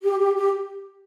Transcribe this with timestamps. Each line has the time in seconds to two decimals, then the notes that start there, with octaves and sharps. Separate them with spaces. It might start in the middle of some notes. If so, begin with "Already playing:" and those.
0.03 G4
0.19 G4
0.35 G4